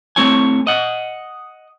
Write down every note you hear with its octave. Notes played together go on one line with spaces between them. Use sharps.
A3 C4 E4 C#5 G#5
D#5 F#5